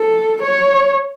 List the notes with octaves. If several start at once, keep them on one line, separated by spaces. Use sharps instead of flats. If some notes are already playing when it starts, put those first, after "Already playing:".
Already playing: A4
C#5